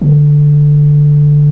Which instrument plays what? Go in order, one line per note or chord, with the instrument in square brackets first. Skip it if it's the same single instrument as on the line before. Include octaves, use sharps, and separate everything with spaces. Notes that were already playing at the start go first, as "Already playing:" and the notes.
[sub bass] D3